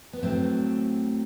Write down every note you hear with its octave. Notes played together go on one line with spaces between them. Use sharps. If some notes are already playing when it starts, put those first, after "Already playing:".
B3
A2 F#3 A3 C4